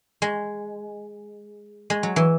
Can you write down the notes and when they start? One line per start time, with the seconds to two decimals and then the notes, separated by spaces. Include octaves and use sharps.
0.22 G#3
1.90 G#3
2.03 F#3
2.16 E3